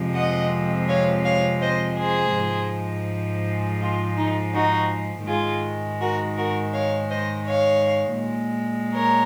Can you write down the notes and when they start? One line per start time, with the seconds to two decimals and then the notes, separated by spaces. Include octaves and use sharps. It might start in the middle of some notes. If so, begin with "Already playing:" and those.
Already playing: F2 C3 F3 G#3
0.14 D#5 F#5
0.88 C#5 F5
1.24 C#5 F5
1.61 C5 D#5
1.97 G#4 C5
2.34 G#2 F3 G#3
3.81 F4
4.16 D#4
4.54 D#4 F#4
5.26 G#2 D#3 G#3 F4 G#4
6.00 F#4 A#4
6.37 F#4 A#4
6.73 C#5 F5
7.09 C5 D#5
7.46 C#5 F5
8.19 A#2 G#3
8.92 A#4 C#5